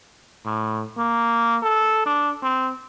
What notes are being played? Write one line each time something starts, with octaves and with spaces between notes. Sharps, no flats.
A2
A#3
A4
D4
C4